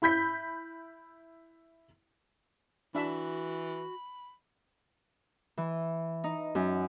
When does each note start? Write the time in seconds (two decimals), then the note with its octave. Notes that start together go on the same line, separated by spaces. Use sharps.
0.02 E4 B5 G6 B6
2.95 E3 D4 F#4 E5 B5
5.57 E3
6.24 D#4
6.55 F#2